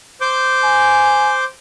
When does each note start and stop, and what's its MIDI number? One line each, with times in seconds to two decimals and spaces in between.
0.21 1.44 72
0.21 1.44 86
0.21 1.44 91
0.63 1.36 80